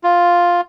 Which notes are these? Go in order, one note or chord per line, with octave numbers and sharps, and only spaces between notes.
F4